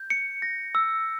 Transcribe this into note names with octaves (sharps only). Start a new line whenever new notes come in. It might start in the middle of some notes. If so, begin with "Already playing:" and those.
Already playing: G6
C#7
A#6
E6